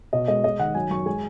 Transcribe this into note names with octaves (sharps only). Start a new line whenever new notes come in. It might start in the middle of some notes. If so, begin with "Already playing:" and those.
B2 D#5
G#3 D#5
G#3 D#5
D#3 F#5
F#3 G#5
F#2 C#6
G#3 G#5